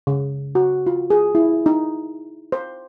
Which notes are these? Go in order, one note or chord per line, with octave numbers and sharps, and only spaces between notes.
C#3
F#4
F4
G#4
E4
D#4
C5